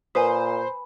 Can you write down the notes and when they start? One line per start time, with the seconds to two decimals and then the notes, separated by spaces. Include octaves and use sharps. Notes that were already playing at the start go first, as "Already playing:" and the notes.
0.15 A#2 B4 C5 G#5 D#6